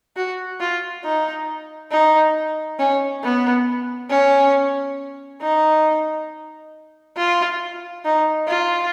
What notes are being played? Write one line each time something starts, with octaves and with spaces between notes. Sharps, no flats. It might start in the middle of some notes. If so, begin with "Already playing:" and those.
F#4
F4
D#4
D#4
C#4
B3
C#4
D#4
F4
D#4
F4